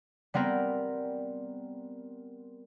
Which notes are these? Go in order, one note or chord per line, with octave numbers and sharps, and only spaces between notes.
G3 B3 C4 A#4